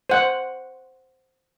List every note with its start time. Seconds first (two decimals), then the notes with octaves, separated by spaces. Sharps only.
0.10 C5 F#5